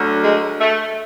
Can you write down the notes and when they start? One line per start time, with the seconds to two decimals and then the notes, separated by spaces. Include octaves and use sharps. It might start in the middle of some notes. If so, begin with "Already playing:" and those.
Already playing: D2 D3 F#3
0.23 G#3
0.60 A3